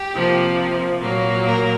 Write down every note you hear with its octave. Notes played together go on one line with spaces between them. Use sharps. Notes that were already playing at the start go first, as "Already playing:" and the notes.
Already playing: G4
C3 F3 A#3
A#2 F#3 A#3
A#4